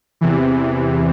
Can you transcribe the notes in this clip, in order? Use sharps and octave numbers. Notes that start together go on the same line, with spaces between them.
E2 C3 E3